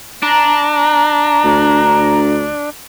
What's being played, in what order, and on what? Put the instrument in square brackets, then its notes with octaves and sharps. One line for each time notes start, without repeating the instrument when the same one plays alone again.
[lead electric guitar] D4 [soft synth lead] A#5
[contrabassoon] D2